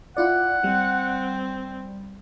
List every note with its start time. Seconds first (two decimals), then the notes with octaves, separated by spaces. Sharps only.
0.17 E4 F4 D5 F#5
0.64 G3 C4